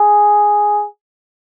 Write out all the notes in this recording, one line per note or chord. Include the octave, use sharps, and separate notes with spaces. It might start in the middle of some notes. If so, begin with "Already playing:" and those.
Already playing: G#4